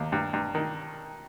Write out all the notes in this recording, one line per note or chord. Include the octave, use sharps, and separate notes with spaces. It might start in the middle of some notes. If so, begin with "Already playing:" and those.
Already playing: D#2
G2
G2
D#3